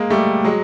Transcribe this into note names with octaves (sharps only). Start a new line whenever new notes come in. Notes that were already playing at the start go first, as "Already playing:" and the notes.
Already playing: G#3 A#3
G3 A3
F#3 G#3